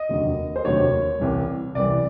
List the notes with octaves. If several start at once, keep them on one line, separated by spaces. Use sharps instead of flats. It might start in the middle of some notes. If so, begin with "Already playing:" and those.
Already playing: D#5
F1 D#2 D3 F#3
C5
F1 D#2 D3 F#3 C#5
C2 C3 E3 G3
C2 C3 E3 G3 D5